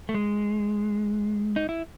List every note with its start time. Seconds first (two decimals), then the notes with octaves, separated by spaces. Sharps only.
0.09 A3
0.14 G#3
1.56 D#4
1.69 E4